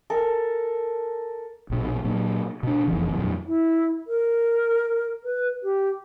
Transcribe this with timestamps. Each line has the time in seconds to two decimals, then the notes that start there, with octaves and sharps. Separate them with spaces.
0.10 A4 A#4
1.70 A#1 B2
2.04 A#2 F#3
2.63 B2 D4
2.88 E1 A#1 F2 E3
3.15 F2 A#2 F#3
3.47 E4
4.07 A#4
5.24 B4
5.63 G4